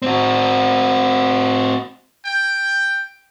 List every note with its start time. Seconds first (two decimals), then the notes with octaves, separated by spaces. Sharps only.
0.02 C4 F#4
2.25 G5